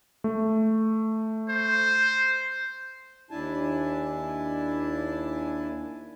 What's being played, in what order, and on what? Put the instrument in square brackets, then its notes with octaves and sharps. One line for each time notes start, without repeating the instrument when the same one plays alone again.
[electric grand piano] A3
[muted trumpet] C5
[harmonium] D#2 D4 E4 G#5 A5